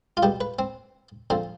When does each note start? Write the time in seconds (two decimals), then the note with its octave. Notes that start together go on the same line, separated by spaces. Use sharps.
0.17 F4
0.23 B2 G3 G4
0.41 B4
0.59 C4
1.30 D3 F3 C4